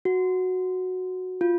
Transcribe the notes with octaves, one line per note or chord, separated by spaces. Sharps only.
F#4
F4